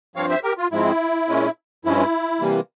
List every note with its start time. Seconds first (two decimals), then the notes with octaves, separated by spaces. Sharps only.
0.16 G2 F3 C4 C#5 F5
0.29 C5 E5
0.43 G4 A#4
0.58 F4
0.72 G#2 F3 G#3 C4 E4
1.29 A#2 G#3 C#4
1.85 G2 F3 G#3 C#4 E4
2.41 C3 E3 G3 A#3